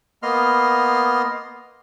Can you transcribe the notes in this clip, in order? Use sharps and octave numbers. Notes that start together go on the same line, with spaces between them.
A#3 B3 D#5 C6 F6